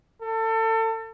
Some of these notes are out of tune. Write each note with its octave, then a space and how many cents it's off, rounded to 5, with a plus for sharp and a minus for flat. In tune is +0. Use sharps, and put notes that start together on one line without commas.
A4 +30